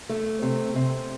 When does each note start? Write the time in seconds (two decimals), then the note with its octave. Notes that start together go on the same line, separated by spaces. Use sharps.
0.09 A3
0.42 C3
0.75 C3